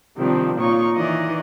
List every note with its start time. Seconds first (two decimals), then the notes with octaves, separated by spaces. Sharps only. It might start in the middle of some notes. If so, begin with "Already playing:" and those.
0.17 C3 D#3 F3 G3 C4 D4
0.58 A#2 A#3 D#4 F4 C#5 C#6
0.94 D#3 E3 D5 D#5